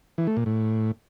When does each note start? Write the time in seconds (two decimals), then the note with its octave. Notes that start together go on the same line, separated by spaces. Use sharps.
0.18 E3
0.27 A3
0.37 A#2
0.46 A2